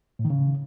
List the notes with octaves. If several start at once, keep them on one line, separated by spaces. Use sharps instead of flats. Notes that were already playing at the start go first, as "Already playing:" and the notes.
A2
D#3
C#3